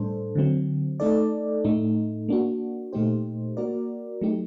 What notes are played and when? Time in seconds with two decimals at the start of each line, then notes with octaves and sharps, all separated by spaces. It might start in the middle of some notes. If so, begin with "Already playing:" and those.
Already playing: A2 G3 D4 A4 C5
0.35 D3 F#3 C4
1.00 A3 D#4 A4 D5
1.65 A2 A3 D#4
2.29 A#3 D4 F#4
2.93 A#2 A3 D#4 G4 C5
3.57 A#3 F#4 A#4 D5
4.21 F#3 A3 D#4 G4